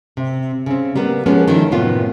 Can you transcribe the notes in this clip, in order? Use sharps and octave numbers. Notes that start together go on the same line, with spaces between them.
C3
C#3 C4
G3 A#3 B3
F3 G#3 A#3 B3 C#4
D#3 F3 G3 A3 E4
F#2 A2 C3 A#3 B3 F4